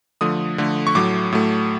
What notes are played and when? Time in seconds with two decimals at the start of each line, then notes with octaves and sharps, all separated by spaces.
0.21 D3 F3 A3 D#6
0.58 D3 F3 A3
0.87 C#6
0.95 A2 F#3 A3 D6
1.32 A2 F#3 A3